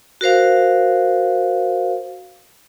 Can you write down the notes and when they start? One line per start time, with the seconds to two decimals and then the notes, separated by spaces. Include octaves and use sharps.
0.21 F#4 A#4 C5 F5